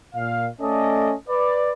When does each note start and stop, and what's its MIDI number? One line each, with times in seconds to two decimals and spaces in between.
0.15 0.48 46
0.15 0.48 77
0.60 1.13 57
0.60 1.13 61
0.60 1.13 69
0.60 1.13 74
0.60 1.13 75
1.29 1.72 71
1.29 1.72 74